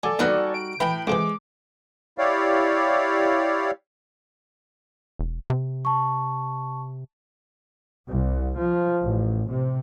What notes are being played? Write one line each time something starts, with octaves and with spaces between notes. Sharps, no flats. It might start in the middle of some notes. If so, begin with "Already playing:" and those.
F#3 A4 D5 G#5
D#2 F#3 G3 B3 D#4 F#4
D7
A2 E3 G5 A#5 B5
F2 C3 E3 G#3 D6
E4 G4 C#5 D5 F5
E1
C3
A5 C#6
C2
F3
A1
C3